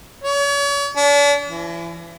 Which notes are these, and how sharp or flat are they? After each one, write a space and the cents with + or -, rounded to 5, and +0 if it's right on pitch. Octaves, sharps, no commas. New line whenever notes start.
C#5 +40
D4 -40
E3 +35